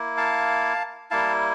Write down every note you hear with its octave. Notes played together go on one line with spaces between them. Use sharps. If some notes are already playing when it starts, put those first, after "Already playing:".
Already playing: A#3 E4
F5 A5
G3 A#3 E4 F5 A5